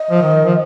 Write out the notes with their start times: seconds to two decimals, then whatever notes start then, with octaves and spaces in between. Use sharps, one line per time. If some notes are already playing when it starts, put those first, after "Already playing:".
Already playing: D#5
0.11 F3
0.22 D#3
0.45 F3